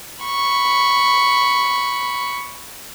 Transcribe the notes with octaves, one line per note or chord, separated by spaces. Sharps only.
B5 C#6